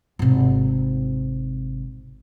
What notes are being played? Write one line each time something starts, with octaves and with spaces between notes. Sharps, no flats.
G#1 C3